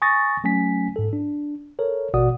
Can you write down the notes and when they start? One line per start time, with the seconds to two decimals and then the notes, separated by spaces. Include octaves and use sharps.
0.02 G#5 C#6 D#6 A6 A#6
0.44 F#3 A3 C#4 G#5 B6
0.96 G#2 A4
1.13 D4
1.79 A4 A#4 C#5
2.14 A1 B2 F#4 D5 F#5 D#6